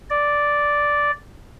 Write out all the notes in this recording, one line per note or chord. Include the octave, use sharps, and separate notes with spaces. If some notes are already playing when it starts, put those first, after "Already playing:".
D5